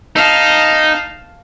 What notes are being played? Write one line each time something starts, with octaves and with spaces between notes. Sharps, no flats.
D#4 F5 A5